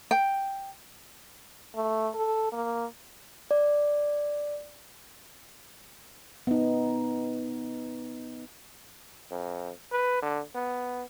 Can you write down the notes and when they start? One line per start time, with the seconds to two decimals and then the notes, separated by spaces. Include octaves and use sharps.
0.11 G5
1.75 A3
2.15 A4
2.52 A#3
3.51 D5
6.47 B3 D#4
9.31 F2
9.92 B4
10.22 D3
10.54 B3